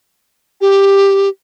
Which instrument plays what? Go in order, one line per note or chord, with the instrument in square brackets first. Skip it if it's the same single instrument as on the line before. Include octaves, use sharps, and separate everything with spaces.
[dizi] G4